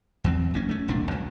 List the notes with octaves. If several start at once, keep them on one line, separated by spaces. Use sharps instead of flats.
E2 F#3 C4
F#1 A#3 C#4
A3 C#4
E1 C2 A#2 D4
C#2 F#3